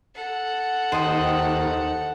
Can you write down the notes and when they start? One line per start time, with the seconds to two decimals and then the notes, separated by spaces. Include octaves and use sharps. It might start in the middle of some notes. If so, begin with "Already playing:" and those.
0.15 A4 F#5
0.92 D#2 C5 D#5 G5